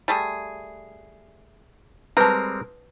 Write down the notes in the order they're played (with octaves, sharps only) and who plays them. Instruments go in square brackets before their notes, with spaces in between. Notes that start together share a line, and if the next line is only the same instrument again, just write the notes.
[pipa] G3 A3 G#4
[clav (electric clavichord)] G3 G#3 C4 [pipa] A#4 [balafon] B4 A5